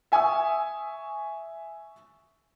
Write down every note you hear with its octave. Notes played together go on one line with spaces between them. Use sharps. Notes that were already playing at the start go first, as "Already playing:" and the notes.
E5 G#5 C#6 D#6 E6